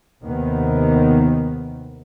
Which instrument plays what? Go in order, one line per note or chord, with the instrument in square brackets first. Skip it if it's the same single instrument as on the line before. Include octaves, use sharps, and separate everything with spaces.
[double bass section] D#2 C3 D#3 B3